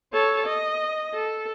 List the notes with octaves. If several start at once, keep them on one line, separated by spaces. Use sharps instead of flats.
A4 C#5
D#5
A4